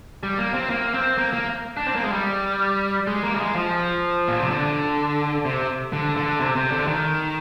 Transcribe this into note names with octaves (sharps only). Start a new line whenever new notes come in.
G3
A#3
C4
A#3
C4
A#3
A#3
D4
C4
A#3
G#3
G3
G#3
A#3
G3
G#3
F3
A#2
C3
D3
C3
D3
D3
C3
C3
D3
D#3